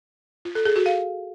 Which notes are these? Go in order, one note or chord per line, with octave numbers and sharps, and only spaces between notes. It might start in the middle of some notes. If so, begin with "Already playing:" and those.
F4
A4
G#4
F#4
F5